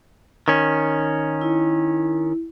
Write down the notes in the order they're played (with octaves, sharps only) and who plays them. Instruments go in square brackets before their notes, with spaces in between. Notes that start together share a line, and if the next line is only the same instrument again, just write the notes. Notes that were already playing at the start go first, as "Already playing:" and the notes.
[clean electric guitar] D#3 C#4
[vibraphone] E4